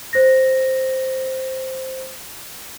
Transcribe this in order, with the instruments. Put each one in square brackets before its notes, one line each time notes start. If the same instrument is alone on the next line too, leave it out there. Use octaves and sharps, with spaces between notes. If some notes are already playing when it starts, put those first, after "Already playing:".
[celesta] C5 A#6